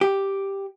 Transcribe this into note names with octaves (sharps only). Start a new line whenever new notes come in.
G4